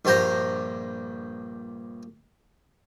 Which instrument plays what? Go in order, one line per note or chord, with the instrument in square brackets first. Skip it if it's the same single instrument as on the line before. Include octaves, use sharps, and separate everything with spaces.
[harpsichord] A#1 G2 G4 C5 A#5